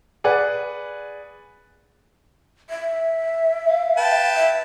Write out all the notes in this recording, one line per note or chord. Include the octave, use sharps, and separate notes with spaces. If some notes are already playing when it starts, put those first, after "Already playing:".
G#4 B4 D5 F#5
E5
F5
B4 G5 A5
E5